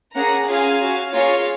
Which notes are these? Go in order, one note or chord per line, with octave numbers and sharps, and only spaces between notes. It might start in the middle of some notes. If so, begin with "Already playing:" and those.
A#3 C#4 G#4 F#5 A#5
C#4 F4 G#4 F5 G#5
C#4 F#4
A#3 F4 G#4 C#5 F5